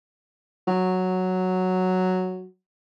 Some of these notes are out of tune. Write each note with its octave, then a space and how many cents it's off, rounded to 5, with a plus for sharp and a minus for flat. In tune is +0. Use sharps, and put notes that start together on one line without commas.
F#3 +0